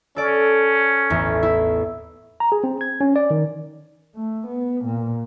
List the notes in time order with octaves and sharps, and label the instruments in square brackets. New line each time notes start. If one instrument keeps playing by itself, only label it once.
[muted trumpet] C#4 [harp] A4 D5
[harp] A1 E2
E4
[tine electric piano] A#5
G#4
C4
G#6
C#4
D5
D#3
[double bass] A3
B3
A#2